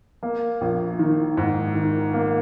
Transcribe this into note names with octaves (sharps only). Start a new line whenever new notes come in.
A#3
A#1
D#3
G#2
D#3
A#3